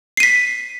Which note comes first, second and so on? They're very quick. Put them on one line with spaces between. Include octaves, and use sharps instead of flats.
C7 D#7 B6